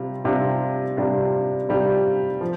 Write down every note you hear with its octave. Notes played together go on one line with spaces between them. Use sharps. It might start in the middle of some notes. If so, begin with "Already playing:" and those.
Already playing: C3 G3 F4
C3 G3 D4 F4
C3 G3 D4 F4
C3 G3 D4 F4
F3